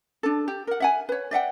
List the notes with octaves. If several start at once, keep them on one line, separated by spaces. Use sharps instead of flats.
D4 A4
G4
A#4 F#5
E5 F#5 G#5
B4 C#5
D5 E5 F#5 G5